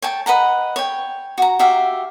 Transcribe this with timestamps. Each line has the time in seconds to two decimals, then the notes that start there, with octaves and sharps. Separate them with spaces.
0.02 C#5 G5 A5
0.26 B4 D#5 F#5 A#5
0.76 C#5 G5
1.38 F#4 A#5
1.59 F#4 G4 E5 F5